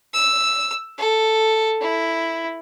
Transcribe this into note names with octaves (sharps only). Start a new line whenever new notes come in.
E6
A4
E4